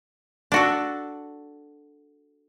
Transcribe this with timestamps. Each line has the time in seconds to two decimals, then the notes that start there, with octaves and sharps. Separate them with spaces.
0.52 D4 F#4 A4